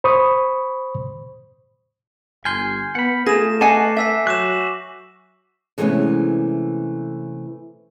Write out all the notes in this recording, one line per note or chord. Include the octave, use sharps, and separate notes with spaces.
C5 B5 C#6 D#6
G1 G#5 C6 F6 G6
B3 F#5 B5
A3 F4 G#4 A#6 E7
B4 D#5 F#5 G#5 A5 D6 C7
E5 G#5 E6 B6
F#3 F#4 C#6 D6 F#6 E7
C3 E3 G#3 A3 B3 C#4